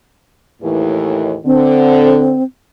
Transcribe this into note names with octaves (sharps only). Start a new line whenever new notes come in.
D#2 A2 E3
D3 C4